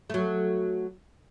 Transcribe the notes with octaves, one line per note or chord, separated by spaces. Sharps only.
F#3 A3